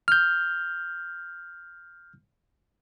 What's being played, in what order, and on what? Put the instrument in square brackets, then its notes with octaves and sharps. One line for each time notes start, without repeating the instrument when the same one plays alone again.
[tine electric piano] F6 G6